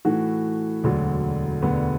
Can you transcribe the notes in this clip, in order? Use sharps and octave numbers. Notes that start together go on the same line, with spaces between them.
A2 E3 A3 F#4
E1 D2 D3 F#3
E1 D2 D3 B3